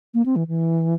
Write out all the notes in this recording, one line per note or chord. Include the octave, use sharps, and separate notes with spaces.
A#3
C4
E3
E3